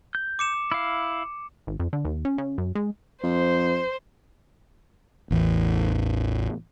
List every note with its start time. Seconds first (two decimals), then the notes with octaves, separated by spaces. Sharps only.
0.15 G6
0.39 D6 C#7 E7
0.72 E4 F5
1.67 G#1
1.80 F2
1.93 D3
2.05 D#2
2.25 C#4
2.38 C#3
2.58 F#2
2.75 G#3
3.24 F2 C5
5.31 A1 E2